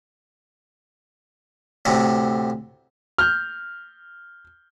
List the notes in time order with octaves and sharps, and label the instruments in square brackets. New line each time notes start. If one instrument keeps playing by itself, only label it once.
[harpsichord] D2 A2 C3
[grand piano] F6 G6